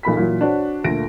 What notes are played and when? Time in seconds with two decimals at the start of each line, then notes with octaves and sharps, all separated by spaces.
0.03 B1 A#2 B5 B6
0.17 A#2 E3 F#3
0.41 D4 F#4 C5 C#5
0.84 D2 A#2 A3 F4 A#6 D7